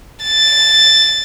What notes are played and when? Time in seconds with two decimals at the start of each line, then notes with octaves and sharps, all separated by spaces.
0.24 A6